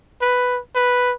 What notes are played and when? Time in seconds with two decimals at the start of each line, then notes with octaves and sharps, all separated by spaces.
0.21 B4
0.75 B4